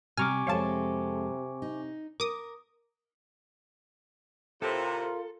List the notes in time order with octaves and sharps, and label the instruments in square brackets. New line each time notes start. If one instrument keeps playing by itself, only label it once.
[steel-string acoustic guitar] C3 G3 [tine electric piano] G#5 C#6 D6 [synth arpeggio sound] A#5 F6
[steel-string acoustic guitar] F2 G#3 A4 [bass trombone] C3 [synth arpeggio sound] C#5 F5 A5
[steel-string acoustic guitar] D#4
[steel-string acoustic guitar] A#4 [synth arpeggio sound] D6 D#6
[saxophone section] A2 C3 [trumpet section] F4 A#4 [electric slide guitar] A4